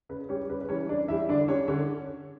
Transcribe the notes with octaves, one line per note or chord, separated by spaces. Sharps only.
C#3 B4
G3 C#4 C#5
C#3 B4
B4
E3 G3 C#4 C#5
C#3 D4 D5
E3 G3 E4 E5
D3 D4 D5
G3 C#4 C#5
D3 C#4 C#5